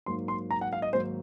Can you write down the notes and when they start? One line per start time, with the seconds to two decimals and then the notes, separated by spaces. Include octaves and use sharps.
0.06 G#2 F#3 A#3 C6
0.28 C6
0.51 A#5
0.61 F#5
0.73 F5
0.82 D#5
0.93 G#2 D#3 F#3 A#3 C5